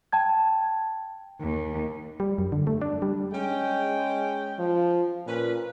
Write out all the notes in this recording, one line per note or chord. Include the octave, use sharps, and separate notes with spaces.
G5 A5 G#6
D#2
G3
F#2
D3
A3
D4
G3
G#3 C#4 G5
F3
A#2 C#4 B4